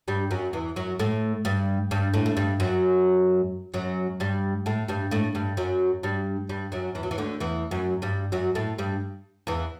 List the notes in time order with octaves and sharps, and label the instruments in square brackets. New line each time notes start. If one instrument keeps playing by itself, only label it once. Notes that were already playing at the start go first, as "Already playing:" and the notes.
[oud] G2 G3
F#2 F#3
E2 E3
F#2 F#3
A2 A3
G2 G3
G2 G3
A2 A3
A3
G2 G3
F#2 F#3
F#2 F#3
G2 G3
A2 A3
G2 G3
A2 A3
G2 G3
F#2 F#3
G2 G3
G2 G3
F#2 F#3
E2 E3
F#3
E3
D2 D3
E2 E3
F#2 F#3
G2 G3
F#2 F#3
A2 A3
G2 G3
E2 E3